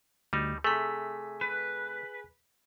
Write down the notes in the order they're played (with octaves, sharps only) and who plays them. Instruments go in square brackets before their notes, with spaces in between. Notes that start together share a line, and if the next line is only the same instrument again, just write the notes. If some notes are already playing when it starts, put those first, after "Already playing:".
[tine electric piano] D2 [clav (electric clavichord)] G3 D#4
[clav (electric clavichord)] C3 A3 [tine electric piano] G#4 G#5 B6
[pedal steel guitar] B4